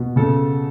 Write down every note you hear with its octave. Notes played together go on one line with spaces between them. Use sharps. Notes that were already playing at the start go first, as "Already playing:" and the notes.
Already playing: B2
C#3 A4